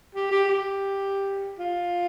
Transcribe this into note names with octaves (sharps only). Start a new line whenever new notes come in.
G4
G4
G4
F4